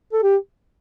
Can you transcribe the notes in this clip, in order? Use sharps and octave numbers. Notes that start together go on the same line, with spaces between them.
A4
G4